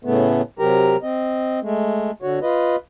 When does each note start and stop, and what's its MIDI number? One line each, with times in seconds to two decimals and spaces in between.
0.05 0.42 45
0.05 0.42 49
0.05 0.42 57
0.05 0.42 59
0.59 0.96 48
0.59 0.96 54
0.59 0.96 67
0.59 0.96 70
0.59 0.96 82
1.03 1.60 60
1.03 1.60 75
1.63 2.11 56
1.63 2.11 57
2.22 2.39 50
2.22 2.39 66
2.22 2.39 73
2.42 2.76 65
2.42 2.76 71
2.42 2.76 75